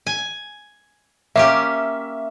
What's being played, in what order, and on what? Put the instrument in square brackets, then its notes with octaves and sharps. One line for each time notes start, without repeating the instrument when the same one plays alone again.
[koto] G#5
[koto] A#3 C#4 G4 [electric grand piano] E5